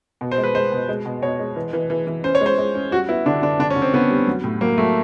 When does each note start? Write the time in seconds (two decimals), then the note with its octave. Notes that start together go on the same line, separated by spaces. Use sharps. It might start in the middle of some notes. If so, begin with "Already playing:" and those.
0.21 B2
0.31 C5
0.38 G#3
0.44 B4
0.55 G#3 C5
0.72 B2
0.89 G#3
1.06 B2
1.22 B2 C#5
1.39 G#3
1.56 E3
1.73 E3
1.90 E3
2.07 E3
2.24 C#4 C5
2.35 C#5
2.41 G#3 C5
2.58 G#3
2.75 C#4
2.91 G3 F#4
3.08 B3 E4
3.26 D3 D4
3.42 D3 D4
3.59 D3 D4
3.70 C#4
3.76 D3
3.82 C4
3.94 D3 B3
4.10 G3
4.27 F#3
4.44 A2
4.61 F#3 A#3
4.78 F#3 A3